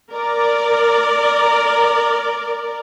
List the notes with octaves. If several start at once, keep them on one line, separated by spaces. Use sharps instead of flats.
A#4 D5